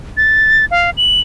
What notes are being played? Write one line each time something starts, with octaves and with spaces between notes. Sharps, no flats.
A6
F5
F#7